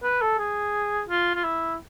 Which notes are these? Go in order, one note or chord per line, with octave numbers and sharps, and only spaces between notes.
B4
A4
G#4
F4
F4
E4